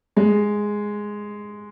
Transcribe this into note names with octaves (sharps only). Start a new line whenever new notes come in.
G#3